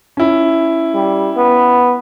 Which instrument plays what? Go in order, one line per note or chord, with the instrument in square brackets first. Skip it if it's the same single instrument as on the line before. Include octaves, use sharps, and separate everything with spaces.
[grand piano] C#4 E4
[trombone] G3
B3